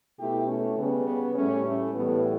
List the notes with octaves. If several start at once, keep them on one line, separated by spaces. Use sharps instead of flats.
B2 A3 E4 G4
A3 C#4
C#3 G3 B3
B3
A2 G3 A3 C#4
A3
A2 E3 G3 B3